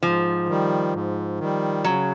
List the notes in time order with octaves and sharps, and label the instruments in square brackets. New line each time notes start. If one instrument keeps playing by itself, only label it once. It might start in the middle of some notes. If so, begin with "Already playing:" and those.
[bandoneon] G#2 [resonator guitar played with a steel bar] F3
[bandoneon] D#3 G3
G#2
D#3 G3
[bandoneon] C#3 [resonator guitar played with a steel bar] F#3